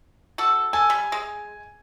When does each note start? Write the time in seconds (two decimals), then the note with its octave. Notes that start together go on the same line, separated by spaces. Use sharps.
0.38 F#4 A4
0.73 A4 G#5
0.90 G3
1.12 G#3